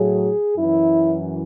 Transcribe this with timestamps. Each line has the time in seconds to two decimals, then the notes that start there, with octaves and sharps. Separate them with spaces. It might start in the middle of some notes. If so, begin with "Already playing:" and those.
Already playing: A2 F#3 G#4
0.57 F#2 E3 E4